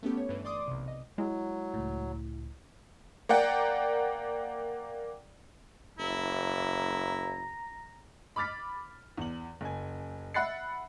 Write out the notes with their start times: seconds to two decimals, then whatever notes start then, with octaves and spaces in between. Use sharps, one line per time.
0.03 A3 B3 C#4 G4 A4
0.17 C#5
0.29 G2 E3
0.45 D5 C6 D6 D#6
0.68 B1 C3
0.88 D#5
1.18 F#3 G#3 E4
1.74 C#2 A2
3.29 A#3 D5 F#5 G5
5.99 F#1 E4 A#5
8.36 B5 D6 F6 A6 B6
9.18 E2 F#7
9.61 F#1 G#5
10.34 E5 F#5 B5 F#6 A6 C7